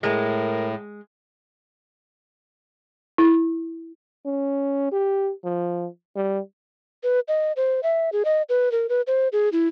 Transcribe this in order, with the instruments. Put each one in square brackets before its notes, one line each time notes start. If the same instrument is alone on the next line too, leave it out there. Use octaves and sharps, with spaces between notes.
[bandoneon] A2 [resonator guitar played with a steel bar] G#3 [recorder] A#4
[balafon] E4
[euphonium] C#4
G4
F3
G3
[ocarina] B4
D#5
C5
E5
G#4
D#5
B4
A#4
B4
C5
G#4
E4